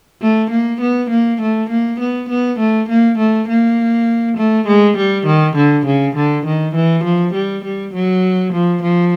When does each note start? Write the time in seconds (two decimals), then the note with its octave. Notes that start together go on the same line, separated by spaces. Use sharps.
0.22 A3
0.51 A#3
0.81 B3
1.10 A#3
1.41 A3
1.70 A#3
2.00 B3
2.29 B3
2.60 A3
2.89 A#3
3.18 A3
3.48 A#3
4.37 A3
4.67 G#3
4.97 G3
5.26 D#3
5.56 D3
5.86 C#3
6.16 D3
6.46 D#3
6.75 E3
7.04 F3
7.34 G3
7.65 G3
7.94 F#3
8.53 F3
8.83 F3